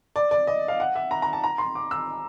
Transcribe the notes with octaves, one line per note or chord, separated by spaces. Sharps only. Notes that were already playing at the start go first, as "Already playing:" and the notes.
D5
D5
D#5
F5
F#5
E5
A#5
A#5
A5
A#5
C6
D6
E6